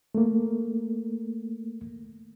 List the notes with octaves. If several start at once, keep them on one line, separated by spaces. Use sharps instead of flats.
A3 A#3